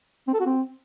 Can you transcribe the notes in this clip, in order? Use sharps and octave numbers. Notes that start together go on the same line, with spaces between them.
C4
A4
F#4
C4